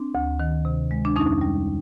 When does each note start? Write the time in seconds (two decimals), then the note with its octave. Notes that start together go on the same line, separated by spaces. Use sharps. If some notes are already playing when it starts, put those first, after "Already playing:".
Already playing: C4 D4
0.15 D2
0.40 D#3
0.65 C3
0.91 G#3
1.05 D4
1.16 F2 C#4 D#4
1.41 G3